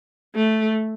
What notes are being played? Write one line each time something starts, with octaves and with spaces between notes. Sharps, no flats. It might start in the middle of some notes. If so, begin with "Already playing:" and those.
A3